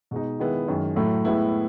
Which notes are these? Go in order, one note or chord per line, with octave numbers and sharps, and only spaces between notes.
B2 G#3 D#4
D#3 G#3 B3 E4
F#2 D#3 G#3
A2 F#3 A3 E4
A2 G#3 B3 E4